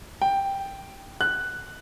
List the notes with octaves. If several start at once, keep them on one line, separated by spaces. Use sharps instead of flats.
G5
F#6